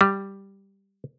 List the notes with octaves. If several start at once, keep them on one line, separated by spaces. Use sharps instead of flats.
G3